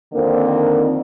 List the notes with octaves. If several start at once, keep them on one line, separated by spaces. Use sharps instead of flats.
F2 D3 D#3 A#3 C4